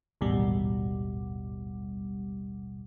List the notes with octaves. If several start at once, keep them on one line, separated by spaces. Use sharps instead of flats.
A1 D#2 G#2 B2 G3